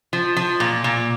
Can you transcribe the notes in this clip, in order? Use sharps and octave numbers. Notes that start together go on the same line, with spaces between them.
F3
F3
A#2
A#2